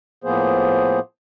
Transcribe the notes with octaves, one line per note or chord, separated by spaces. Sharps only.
A2 F3 A#3 B3 G#4 C5